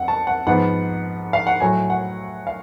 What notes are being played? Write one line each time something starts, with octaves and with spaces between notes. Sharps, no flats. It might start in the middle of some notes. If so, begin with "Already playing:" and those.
Already playing: F2 F3 F#5
A5
F#5
G#2 F3 B3 F#5
F5
F#5
A2 F#3 A3 G#5
F#5
F5